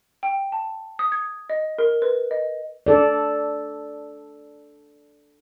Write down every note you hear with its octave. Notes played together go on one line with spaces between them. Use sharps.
G5
A5
D#6
G#6
D#5
A#4
B4
D#5
D4 A4 D5